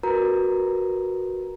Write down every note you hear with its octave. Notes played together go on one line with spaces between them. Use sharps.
F#4 A#4 B4 A#5